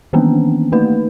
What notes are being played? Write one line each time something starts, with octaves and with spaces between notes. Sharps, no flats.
D#3 E3 A#3 B3 C#4 D4
A3 A#3 D#4 B4